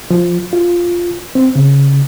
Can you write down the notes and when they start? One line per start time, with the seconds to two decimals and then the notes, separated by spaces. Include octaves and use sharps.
0.10 F3
0.53 F4
1.35 C4
1.55 C#3